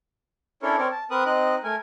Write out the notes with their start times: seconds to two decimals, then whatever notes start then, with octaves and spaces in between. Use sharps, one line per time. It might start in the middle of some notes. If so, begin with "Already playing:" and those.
0.63 C#4 D4 E4 A4 A#4 C#5
0.78 C4 A#4 C#5 D5
0.91 A5
1.11 C4 A#4 B4 D#6 F#6
1.26 C4 D#4 D#5 F#6
1.64 A3 A#4 G#5